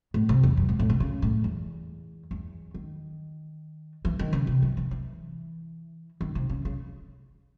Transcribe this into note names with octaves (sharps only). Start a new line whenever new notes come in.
A2
C3
E2
F#2
G#2
A2
C3
C#3
A2
E2
E2
D#3
E3
D#3
C#3
C3
E3
E3
E3
D#3
C3
C#3
C#3